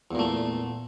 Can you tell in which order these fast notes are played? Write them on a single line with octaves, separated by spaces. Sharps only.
E2 A#2 A3